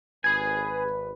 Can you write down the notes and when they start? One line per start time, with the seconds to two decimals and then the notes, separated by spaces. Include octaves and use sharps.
0.24 G#1 G#4 B4 G#5 G#6